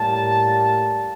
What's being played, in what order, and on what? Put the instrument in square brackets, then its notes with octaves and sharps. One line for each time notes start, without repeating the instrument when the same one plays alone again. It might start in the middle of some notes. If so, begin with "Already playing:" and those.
Already playing: [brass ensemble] A2 G3 A#3 A5